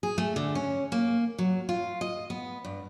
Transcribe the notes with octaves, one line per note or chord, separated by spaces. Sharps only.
G#4
A3
D3
C#4
A#3
F#3
F4
D#5
B3
G2